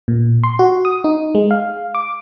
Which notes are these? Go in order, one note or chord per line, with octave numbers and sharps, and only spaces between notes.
A#2
C6
F#4
D#6
D#4
G#3
F5
D6